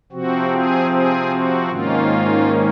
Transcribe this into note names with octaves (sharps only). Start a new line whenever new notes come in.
C3 F3 C4 F#4
G#4
G#4
F#4
G#2 D#3 A#3 C#4 F4